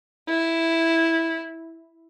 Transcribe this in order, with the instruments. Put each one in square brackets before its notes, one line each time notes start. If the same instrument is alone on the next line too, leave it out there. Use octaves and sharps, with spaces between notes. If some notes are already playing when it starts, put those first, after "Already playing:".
[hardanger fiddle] E4